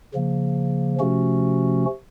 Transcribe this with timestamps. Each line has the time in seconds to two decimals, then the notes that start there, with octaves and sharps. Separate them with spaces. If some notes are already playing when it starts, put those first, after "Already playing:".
0.14 C#3 F3 A#3
1.00 C3 F3 A3 C#4 F#4